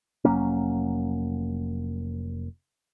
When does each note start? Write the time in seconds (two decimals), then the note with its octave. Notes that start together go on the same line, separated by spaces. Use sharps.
0.25 F1 F#3 A#3 C#4